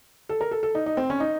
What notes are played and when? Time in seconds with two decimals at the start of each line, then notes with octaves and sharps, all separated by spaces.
0.29 A4
0.41 A#4
0.51 A4
0.63 A4
0.75 D#4
0.86 D#4
0.97 C4
1.10 C#4
1.20 D#4